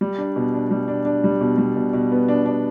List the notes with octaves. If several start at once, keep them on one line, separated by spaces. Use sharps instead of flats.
G3
D4
B2
D4
G3
D4
D4
G3
B2
G3
B2
B2
B3
D4
D4